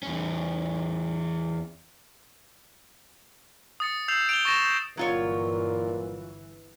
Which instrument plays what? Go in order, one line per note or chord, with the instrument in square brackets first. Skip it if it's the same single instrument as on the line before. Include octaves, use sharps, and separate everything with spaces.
[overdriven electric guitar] E2 C#4
[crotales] D#6 A6 C#7
E6 G6 C7 E7 F7
D7 F7 G7
C#6 A6 A#6 E7 F7
G6
[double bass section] G1 E3 [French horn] A#2 [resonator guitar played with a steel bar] F#3 F4 C#5